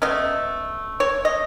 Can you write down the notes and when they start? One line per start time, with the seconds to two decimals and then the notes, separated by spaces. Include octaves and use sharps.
0.02 B2 A3 C#4 D#5
1.00 C#5
1.25 D#5